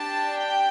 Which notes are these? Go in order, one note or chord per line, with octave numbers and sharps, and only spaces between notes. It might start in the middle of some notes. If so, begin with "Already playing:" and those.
Already playing: D4 G4 A5
G5